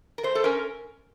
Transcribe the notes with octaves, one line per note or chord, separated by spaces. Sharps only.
A#4
A3 C5
A4
C#4 A#4